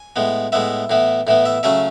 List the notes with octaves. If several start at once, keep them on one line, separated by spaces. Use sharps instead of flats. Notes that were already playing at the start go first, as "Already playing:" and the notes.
Already playing: G#5
A2 G#3 B3
A2 G#3 B3 E5
A2 E3 B3
A2 E3 B3
E5
C#3 F#3 A3 C#4 E5